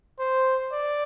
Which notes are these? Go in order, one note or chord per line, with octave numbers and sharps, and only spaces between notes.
C5
D5